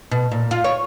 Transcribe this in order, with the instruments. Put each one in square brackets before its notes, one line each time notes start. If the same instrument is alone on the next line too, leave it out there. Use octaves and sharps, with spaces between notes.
[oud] B2
A#2
F4
C#5